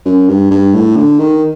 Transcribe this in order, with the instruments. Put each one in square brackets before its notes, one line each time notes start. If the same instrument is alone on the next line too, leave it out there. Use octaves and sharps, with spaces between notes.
[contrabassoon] F#2
G2
G2
A2
D3
D#3